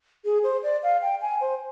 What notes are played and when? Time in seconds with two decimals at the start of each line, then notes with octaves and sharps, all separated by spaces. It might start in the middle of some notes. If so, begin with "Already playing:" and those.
0.25 G#4
0.44 C5
0.63 D5
0.83 F5
1.02 G5
1.21 G#5
1.41 C5